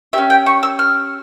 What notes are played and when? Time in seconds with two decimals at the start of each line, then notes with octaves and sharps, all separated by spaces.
0.13 C#4 G4 E5
0.30 G5
0.46 C#6
0.63 E6
0.79 F6